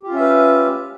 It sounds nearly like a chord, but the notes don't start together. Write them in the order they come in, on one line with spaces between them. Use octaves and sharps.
G4 F4 C#4 E5 B4